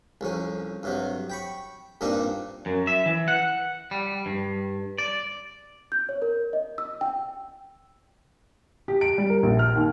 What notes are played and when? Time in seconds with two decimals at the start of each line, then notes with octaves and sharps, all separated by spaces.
0.21 C2 F2 C#4
0.83 G2 C3 F#3
1.30 G5 B5 C#6
2.01 G2 A#2 A#3 C4 D4 D#4
2.66 F#2
2.87 E5
3.06 E3
3.28 F#5
3.91 G3
4.26 G2
4.98 D5
5.92 G6
6.09 C#5
6.22 A#4
6.53 D#5
6.78 E6
7.01 G5
8.88 G4
9.01 D7
9.18 G3
9.30 A#4
9.43 A#1
9.59 F6
9.75 D#2